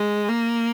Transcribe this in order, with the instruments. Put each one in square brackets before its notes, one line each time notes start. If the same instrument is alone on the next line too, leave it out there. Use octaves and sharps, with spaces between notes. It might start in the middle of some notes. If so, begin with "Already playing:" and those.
Already playing: [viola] G#3
A#3